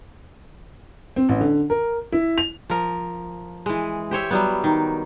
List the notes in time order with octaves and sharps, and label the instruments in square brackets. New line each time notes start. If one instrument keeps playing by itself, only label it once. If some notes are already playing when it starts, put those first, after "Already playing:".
[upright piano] C4
A1
D3
A#4
E4
F7
[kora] F3 A#4
E3 G#3
G4 C5 C#5 E5
F#3 G3 B3
D#3